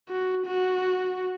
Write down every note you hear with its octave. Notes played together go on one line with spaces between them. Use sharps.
F#4
F#4